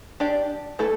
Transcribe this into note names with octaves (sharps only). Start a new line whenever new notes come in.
D4 G4 D5
E3 A3 E4 A4